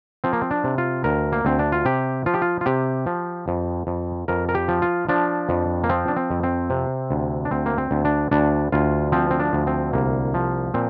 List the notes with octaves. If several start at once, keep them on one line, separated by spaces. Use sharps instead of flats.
F3 C4
A#3
C4
D4
C3
F4
D2 A#4
A#3
D2 C4
D4
F4
C3 G4
F3 F4
G4
F4
F4
C3 G4
F3
F2
F2
F2 A#4
A#4
G4
F3
F4
F3 D4
F2
A#3
F3 C4
D4
C4
F2
C4
C3
D2
D4
D2 C4
A#3
C4
D2
D4
D2 D4
D2 F4
F3 C4
C4
D4
D2
C4
C2 A#3
F3
A#2 C4